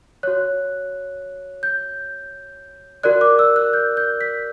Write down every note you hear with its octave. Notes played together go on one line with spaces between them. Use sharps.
F#4 C#5 F#6
G6
F#4 A#4 D5 F#6
D6
E6
F#6
G6
G6
B6